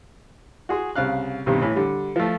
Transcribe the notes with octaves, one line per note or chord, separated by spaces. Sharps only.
F#4 G#4 C6
C2 C#3 F5 F#6
B1 G2 C3 D#3
A2 E3
D3 G3
F3 A3